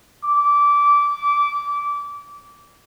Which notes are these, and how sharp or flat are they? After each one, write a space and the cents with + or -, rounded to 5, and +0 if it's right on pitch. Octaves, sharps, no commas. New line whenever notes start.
D6 -20